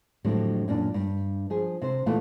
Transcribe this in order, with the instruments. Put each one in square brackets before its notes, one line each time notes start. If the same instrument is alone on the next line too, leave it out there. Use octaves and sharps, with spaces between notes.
[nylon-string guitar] F2 A2 D3 F#3 G3
F#2 A#2 C#4 D4
G2
F3 G#4
C3 C5
A#2 E3 A3 B3 F4